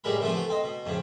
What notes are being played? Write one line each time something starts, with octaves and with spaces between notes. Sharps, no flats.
A2 G3 G#3 A#4 B5
C3 E3 F3 A3 B3
A3 B3
C4 D#5
B2
F2 A2 C#3